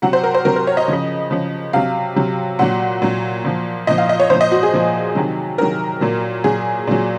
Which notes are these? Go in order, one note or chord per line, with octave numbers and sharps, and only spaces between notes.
C3 F#3 F#5
C5
A#4
C5
C3 F#3 A#4
A#4
C#5
D#5
C#3 F3
C#3 F3
C3 F#3 F5
C3 F#3
A#2 F#3 F#5
A#2 F#3
A#2 F3
A#2 F3 D#5
F5
D#5
C#5
A#2 F3 C5
D#5
F#4
G#4
A#2 F3
C3 D#3 F#3
C3 D#3 F#3 A#4
A#2 F#3
A#2 F#3 G#4
A#2 F#3